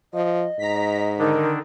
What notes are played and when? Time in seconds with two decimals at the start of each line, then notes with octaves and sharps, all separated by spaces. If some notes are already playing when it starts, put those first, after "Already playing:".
0.14 F3 D#5
0.59 G#2 A#5 B6
1.19 D3 D#3 D4 D#4 A#4